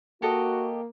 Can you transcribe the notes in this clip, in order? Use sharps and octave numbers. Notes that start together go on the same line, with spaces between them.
A#3 F#4 G4 A4 D#5